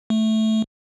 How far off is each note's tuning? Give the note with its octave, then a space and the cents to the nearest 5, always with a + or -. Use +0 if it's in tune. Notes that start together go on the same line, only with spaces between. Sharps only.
A3 -5